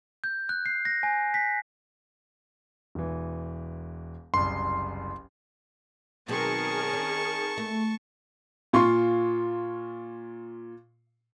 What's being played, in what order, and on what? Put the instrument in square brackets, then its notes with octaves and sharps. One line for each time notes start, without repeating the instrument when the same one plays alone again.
[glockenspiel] G6
F#6
C7
A#6
G#5
B6
[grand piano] E1 E3
[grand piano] F#1 C2 [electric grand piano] C6
[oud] B2 F#3 C4 [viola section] D#3 G#4 A#4 [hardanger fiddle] A5 C#6
[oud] C#4
A3
[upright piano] A#2 F4 C6 C#6